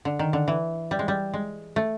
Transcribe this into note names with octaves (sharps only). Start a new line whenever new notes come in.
D3
D#3
D3
E3
G3
G#3
G3
G#3
A3